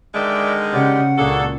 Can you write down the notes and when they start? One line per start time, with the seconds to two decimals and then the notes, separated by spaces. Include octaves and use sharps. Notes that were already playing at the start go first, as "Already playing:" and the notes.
0.15 D3 D#3 G#3 D5 E5 G5
0.73 C#3 G4 D5 F#5
1.18 C#2 A#2 A#3 D4 F#4 G#4 A4